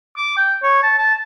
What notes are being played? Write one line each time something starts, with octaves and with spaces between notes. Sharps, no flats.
D6
G5
C#5
A5
A5